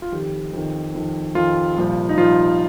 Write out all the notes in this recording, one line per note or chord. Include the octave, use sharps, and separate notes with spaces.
F4
F2 D#3 G4
F2 D#3
F2 D#3
F2 D#3 F4
C2 A#2 F3
D#4
C2 A#2 F3 F4